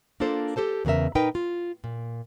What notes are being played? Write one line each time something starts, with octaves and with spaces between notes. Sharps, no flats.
A#3 D4 F4 A4 C5
G4 A4 C5 A5
E2 C#3 B3 A#4 E5
A#2 D#4 A#4 B4 G5
F4
A#2